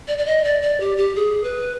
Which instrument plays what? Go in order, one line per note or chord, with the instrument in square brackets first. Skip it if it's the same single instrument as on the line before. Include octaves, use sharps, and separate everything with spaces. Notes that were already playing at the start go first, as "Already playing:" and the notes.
[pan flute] D5
D5
D#5
D5
D5
G4
G4
G#4
B4